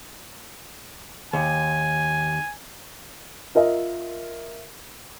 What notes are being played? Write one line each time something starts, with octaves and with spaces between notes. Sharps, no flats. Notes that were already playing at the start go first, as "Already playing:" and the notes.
D#2 G#5
F4 A#4 D#5 E5